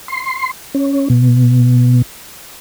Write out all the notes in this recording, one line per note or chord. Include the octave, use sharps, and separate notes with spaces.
C6
C#4
B2